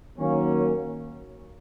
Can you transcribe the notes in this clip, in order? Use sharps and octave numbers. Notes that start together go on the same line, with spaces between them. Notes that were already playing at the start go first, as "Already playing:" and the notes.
D#3 F#3 A#3 C#4